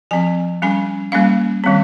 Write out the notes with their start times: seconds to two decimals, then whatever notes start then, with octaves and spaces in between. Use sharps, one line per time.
0.11 F3 C4 G#5
0.62 G3 C#4 G#5
1.12 G3 A#3 C#4 F5
1.64 D#3 G3 C4